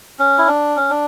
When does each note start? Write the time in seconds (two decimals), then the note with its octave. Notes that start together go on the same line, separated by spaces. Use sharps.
0.19 C#4
0.38 E4
0.48 D4
0.76 C#4
0.90 D4